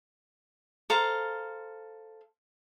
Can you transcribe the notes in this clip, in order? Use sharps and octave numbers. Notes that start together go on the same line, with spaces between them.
A4 C5 F5 A#5